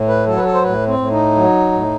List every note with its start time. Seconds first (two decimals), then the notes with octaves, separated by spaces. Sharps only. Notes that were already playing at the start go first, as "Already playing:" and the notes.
Already playing: A2
0.08 B4
0.26 F#3 A4
0.37 B4
0.44 A4
0.54 C5
0.62 A2 B4
0.87 C4
0.99 A2
1.11 D#4
1.35 F#3
1.72 A2